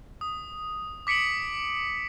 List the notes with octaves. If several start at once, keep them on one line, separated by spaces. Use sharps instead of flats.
D#6
D6 B6 C#7 D7 F#7